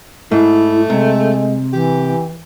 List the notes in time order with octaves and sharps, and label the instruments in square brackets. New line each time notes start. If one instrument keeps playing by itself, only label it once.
[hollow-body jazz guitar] G#2 [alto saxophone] A3 [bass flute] E4
[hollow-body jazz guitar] C3 [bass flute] G#3
[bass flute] E3 [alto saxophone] G4